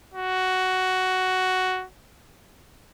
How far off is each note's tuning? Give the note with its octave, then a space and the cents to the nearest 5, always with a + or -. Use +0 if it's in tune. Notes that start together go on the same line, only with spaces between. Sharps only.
F#4 +10